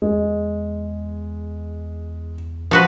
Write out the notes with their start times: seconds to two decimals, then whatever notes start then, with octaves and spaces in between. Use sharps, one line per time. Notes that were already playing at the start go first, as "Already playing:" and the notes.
0.02 E2 G#3
2.71 F3 F#4 B4